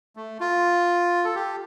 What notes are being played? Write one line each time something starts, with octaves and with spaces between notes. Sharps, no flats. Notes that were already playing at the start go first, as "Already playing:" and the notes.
A3
F4
A4
G4